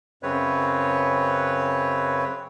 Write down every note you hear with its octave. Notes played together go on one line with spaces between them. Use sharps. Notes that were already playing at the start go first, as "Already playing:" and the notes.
F#2 C#3 C4 B4 C#5